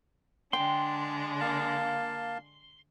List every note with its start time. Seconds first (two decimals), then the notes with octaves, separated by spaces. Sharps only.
0.53 D3 G#3 D4 G5 C6
1.40 A#3 F5 A5